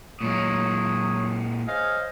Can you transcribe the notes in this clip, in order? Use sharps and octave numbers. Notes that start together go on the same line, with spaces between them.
A#2 F#3 G#3 C#5 D#6
G#4 C5 C#5 D#5 F5